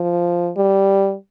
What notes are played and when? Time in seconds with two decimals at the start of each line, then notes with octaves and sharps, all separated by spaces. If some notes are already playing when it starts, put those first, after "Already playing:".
Already playing: F3
0.57 G3